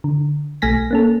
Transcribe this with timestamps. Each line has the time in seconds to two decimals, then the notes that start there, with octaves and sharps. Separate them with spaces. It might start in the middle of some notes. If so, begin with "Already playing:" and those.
0.04 D3
0.62 B1 A3 G#5 A#6 B6
0.91 A#3 C#4 A4